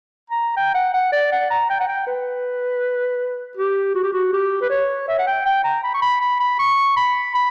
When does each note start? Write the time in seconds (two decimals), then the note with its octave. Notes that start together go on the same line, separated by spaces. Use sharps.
0.30 A#5
0.56 G5
0.74 F#5
0.94 F#5
1.12 D5
1.32 F#5
1.50 A#5
1.69 G5
1.80 F#5
1.88 G5
2.07 B4
3.57 G4
3.95 F#4
4.03 G4
4.13 F#4
4.33 G4
4.61 B4
4.70 C#5
5.08 E5
5.18 F#5
5.27 G5
5.46 G5
5.64 A#5
5.84 B5
5.94 C#6
6.02 B5
6.20 B5
6.40 B5
6.59 C#6
6.96 B5
7.34 B5